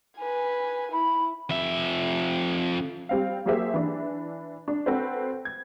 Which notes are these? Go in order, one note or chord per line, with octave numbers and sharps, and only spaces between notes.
B4 G#5
E4 B5
F2 E5
G3 C4 F5
F#3 A#3 G4 G#4 C5 E5
E3 D4
D4
C4 F#4 A4 B4 C5
G#6